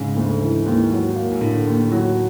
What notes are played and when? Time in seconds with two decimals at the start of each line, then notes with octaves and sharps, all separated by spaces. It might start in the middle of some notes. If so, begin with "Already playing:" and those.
Already playing: G#2 C#3
0.16 D2
0.42 E3
0.66 D#2
0.92 F#3
1.16 A#3
1.32 G#2
1.41 A2 D3
1.67 D#2
1.91 F#3